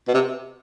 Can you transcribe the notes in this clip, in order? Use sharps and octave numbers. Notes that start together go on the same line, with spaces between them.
B2
C3